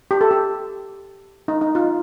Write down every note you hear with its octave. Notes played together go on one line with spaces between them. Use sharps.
G4
A4
G4
D#4
D#4
F4